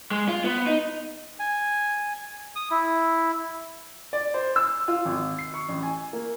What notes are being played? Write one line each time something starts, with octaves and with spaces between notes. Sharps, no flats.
G#3
F4
B3
D#4
G#5
D#6
E4
D5
C5
E6
F4
G#1
C7
C#6
A1
G#5
A#3